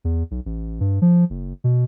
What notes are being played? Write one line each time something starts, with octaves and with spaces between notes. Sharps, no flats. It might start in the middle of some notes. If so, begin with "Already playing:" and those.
E2
B1
A1
G2
F3
F#1
B2